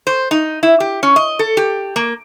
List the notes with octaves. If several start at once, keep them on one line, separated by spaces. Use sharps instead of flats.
C5
D#4
E4
G4
C#4
D#5
A4
G4
A#3